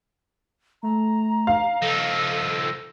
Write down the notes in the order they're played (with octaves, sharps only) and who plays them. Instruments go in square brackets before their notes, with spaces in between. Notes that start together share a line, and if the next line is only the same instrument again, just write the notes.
[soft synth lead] A3 [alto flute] A#5
[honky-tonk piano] F5
[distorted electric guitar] F3 D#4 [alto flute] A4 [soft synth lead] E6